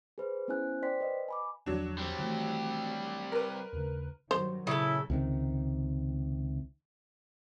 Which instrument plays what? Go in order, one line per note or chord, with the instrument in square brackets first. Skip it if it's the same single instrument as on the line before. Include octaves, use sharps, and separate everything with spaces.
[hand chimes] G#4 B4 C5
B3 C#4 E4 C5 G#5 F#6
C5 D5 G5 C6 B6
B4 D#5
G#5 B5 D6
[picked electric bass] G1 E2 F3 [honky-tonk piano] F#3 D4
[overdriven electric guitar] G3 C4
[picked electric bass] D#3 E3 A3
[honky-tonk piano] A#4 B4
[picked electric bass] D#2 C#3
[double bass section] G2 D#3 F#3 [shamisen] C5
[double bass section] A#2 [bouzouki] C#3 A4 [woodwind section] E4
[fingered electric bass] C#2 C3 D#3